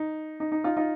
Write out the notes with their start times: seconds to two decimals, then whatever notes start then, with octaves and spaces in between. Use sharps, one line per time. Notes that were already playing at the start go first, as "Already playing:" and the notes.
Already playing: D#4
0.40 D#4
0.52 D#4
0.64 D#4 F4
0.77 D#4 F4